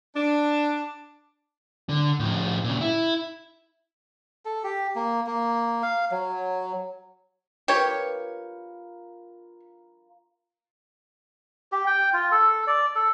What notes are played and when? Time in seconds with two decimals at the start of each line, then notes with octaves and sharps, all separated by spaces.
0.16 D4
1.89 D3
2.19 A2 F3
2.64 A#2 C#3
2.81 E4
4.45 A4
4.64 G4
4.96 A#3
5.27 A#3
5.83 F5
6.11 F#3
7.68 F4 G4 A#4 B4 C#5
11.72 G4
11.87 G5
12.13 F4
12.32 A4
12.67 D5
12.95 A4